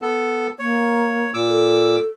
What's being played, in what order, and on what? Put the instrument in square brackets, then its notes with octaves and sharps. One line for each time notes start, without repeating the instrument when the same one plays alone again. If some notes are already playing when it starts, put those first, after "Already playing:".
[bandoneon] B3 A4
[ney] A#3 [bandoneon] C#5
[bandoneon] A#2 D6 E6
[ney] A4